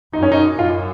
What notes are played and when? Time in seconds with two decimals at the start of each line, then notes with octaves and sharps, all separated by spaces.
0.13 F#2 D#4
0.23 C#4
0.32 D#4
0.59 F#2 F4